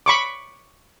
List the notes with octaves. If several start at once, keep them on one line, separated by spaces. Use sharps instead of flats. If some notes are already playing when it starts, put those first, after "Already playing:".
B5 C#6 D6